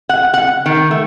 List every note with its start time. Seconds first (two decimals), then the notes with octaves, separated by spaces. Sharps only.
0.09 F#5
0.34 F#5
0.66 D#3
0.91 A3